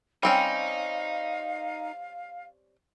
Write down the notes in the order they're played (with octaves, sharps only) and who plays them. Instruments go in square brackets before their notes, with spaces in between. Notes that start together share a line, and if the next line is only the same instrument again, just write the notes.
[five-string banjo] G3 C4 C#4 [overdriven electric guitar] D#4 [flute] F5